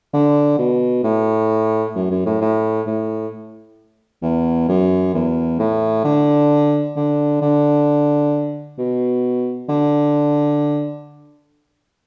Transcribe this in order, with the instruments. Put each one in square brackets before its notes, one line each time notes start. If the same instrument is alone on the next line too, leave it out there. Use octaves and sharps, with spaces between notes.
[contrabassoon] D3
B2
A2
F#2
F#2
A2
A2
A2
E2
F#2
E2
A2
D3
D3
D3
B2
D3